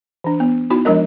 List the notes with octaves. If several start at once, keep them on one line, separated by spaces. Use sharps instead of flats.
E3 D4
B3
B3 D#4 E4 F#4
F3 G#3 D4 A#4 D#5